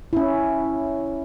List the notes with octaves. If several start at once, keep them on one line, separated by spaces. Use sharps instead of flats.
C#4 E4